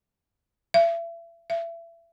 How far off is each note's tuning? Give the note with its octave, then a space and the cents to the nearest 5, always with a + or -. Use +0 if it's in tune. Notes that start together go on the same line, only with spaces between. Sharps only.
E5 +35
E5 +30